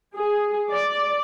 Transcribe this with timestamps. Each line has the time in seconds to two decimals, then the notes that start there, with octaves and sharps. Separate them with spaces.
0.16 G#4
0.70 D5